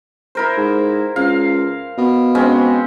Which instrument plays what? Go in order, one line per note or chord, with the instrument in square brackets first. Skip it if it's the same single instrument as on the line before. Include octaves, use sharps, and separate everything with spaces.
[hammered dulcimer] E4 A#4 C5
[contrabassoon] G#2
[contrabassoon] C#2 [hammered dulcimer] F5
[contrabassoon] B2
[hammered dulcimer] G#3 C4 C#4